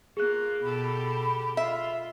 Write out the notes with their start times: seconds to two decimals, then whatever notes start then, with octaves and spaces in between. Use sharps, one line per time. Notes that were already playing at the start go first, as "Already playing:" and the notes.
0.17 A#3 F4 G#4 F#6
0.63 B2 G4 A4 B5
1.57 F4 E5